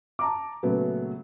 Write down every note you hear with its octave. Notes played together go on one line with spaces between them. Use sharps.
A5 A#5 D6
A#2 C#3 F#3 A3 B3